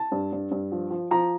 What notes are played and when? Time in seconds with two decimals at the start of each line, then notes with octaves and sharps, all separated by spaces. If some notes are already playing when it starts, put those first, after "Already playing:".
Already playing: A5
0.12 G2
0.32 G2
0.51 G2
0.72 F3
0.91 F3
1.11 F3 A#5